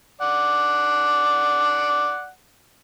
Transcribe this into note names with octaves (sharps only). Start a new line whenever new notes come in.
D5 F#5